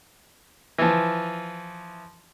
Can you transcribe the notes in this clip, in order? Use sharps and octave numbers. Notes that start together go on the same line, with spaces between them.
E3 F3